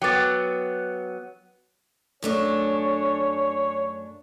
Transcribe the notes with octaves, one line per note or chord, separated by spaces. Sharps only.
F#3 B3 G5 D6 A6
F#2 A3 D4 C#5